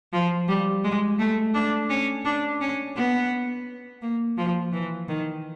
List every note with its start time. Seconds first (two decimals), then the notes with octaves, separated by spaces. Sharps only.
0.13 F3
0.48 G3
0.84 G#3
1.19 A3
1.54 D4
1.90 C#4
2.25 D4
2.61 C#4
2.96 B3
4.02 A#3
4.38 F3
4.73 E3
5.08 D#3